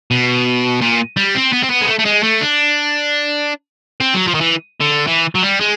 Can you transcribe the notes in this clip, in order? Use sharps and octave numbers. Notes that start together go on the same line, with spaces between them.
B2
A#2
G3
C4
B3
C4
B3
G#3
A3
A3
G#3
A3
D4
C4
F#3
F3
D#3
E3
D3
E3
F#3
G3
G#3